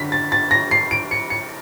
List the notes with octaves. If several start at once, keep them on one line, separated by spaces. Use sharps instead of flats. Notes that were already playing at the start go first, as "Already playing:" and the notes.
Already playing: F#2 D3 B6
A6
A6
A#6
C7
D7
C#7
C#7